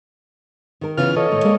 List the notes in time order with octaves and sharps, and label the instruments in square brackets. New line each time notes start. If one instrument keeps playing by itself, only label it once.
[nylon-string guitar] D#3 A#4
[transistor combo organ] C#3 F6 [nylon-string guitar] E3 B3 F4
[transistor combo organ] A4 C#5 D#5
[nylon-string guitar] A2 D#3
G#3 A#3 D5